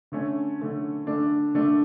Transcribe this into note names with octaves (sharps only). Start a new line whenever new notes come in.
D3 A3 C#4
D3 A3 C#4
D3 A3 D4
D3 A3 D4